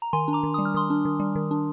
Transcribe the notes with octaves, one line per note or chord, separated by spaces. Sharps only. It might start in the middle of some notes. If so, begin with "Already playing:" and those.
A#5
D#3 G#5 C6
D4
A#5 D6
D#3
G3 D#6
F6
D#3 C6 D#6
D4
D#3
G3
D#3
D4